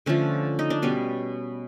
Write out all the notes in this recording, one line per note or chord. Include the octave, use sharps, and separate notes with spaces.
D3 F3 A3 C#4
D#4
D4
B2 G3 B3 C#4